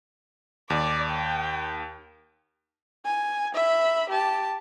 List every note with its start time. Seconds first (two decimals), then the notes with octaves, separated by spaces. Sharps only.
0.70 D#2 D5
1.11 G5
3.05 G#5
3.54 E5 B5
4.09 G4 A5